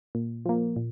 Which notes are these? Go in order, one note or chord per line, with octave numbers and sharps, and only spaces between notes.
A#2
F3 A#3
A#2